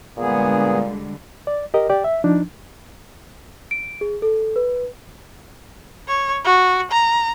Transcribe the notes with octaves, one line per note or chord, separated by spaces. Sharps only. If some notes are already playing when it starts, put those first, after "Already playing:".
A#2 D3 G3 G#3 B3 G#4
D5
G4 A#4 D#5
G4 D5 G5
E5
F3 D4 D#4
D7
G#4
A4
B4
C#5
F#4
A#5